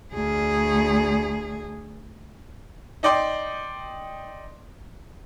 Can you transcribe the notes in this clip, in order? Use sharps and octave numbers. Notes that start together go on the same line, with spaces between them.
D2 G#4
D#4 D5 G5 C6